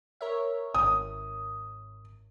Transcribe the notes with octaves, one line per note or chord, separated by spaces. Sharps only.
A#4 C#5 E5
G#1 D#6